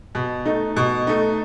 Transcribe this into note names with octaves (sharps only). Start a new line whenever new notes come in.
B2
A3 D#4
B2
A3 D#4